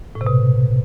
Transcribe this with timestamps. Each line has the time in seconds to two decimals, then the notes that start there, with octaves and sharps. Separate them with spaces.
0.15 A2
0.21 C3
0.26 B2